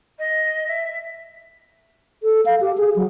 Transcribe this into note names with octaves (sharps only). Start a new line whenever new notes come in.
D#5
E5
A4
F5
G4
G#4
F#3